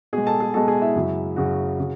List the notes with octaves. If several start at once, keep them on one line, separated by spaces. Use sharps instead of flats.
B2 G#3 G#4 G#5
A4 A5
G#4 G#5
B2 G#3 A4 A5
G#4 G#5
E4 E5
F#2 C#3 F#3
F#2 C#3 F#3 F#4 F#5
C#3